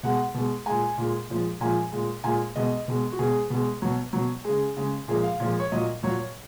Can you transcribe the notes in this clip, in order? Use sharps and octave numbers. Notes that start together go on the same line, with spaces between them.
B2 G#3 F#5
B2 G#3
A#2 G#3 G#5
A#2 G#3
A#2 F3 G#3
A#2 F3 G#3 G#5
A#2 G#3
A#2 G#3 G#5
B2 G#3 D#5
B2 G#3
F#4
B2 G#3 G#4
B2 G#3
B2 F#3
B2 F#3
C#3 G#3 G#4
C#3 G#3
A#2 F3 G#3 G#4
F5
A#2 F3 G#3
C#5
A#2 F#3 D#5
A#2 F#3 C#5